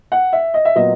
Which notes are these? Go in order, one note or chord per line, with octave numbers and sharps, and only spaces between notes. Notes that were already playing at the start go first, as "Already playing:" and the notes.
F#5
E5
D#5
E5
A#2 F#3 B3 D#5